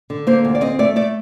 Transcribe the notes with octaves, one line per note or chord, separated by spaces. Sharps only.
D3
A#3 C5
D2
D5
C4 D#5
A3 D5
A3 D5